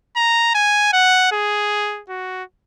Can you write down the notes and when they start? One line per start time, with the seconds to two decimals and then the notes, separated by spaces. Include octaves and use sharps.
0.16 A#5
0.54 G#5
0.93 F#5
1.32 G#4
2.09 F#4